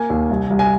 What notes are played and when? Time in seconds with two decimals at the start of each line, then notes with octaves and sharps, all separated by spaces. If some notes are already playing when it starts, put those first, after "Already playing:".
Already playing: A#3 G#5
0.10 D#2
0.30 C2
0.50 C2
0.59 G#5